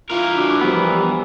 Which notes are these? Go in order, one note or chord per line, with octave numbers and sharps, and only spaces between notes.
E3 F4 A#4
D4 F#4
F3 G3 B3